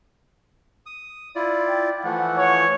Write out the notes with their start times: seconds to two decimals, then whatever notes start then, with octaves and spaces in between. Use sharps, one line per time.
0.86 D#6
1.36 E4 F4 D5
1.68 G5
2.04 E3 F3 A3 F#5
2.38 C#5